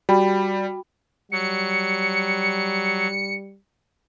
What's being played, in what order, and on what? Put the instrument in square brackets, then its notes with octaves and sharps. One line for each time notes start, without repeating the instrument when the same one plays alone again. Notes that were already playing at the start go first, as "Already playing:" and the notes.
[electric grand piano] G3 [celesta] F#4 G5 B5
[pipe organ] F#3 [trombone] G3 [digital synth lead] C#7